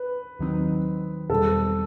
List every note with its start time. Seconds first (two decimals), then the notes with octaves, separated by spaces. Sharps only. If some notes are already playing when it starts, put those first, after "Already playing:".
Already playing: B4
0.39 D#2 D#3 F#3 C4 D#4
1.30 E2 B2 G3 C4 A4